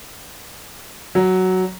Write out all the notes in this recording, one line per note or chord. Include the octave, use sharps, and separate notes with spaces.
F#3